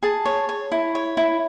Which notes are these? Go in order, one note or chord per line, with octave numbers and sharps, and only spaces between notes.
G#4 A5
C#5
C#5
E4
C#5
E4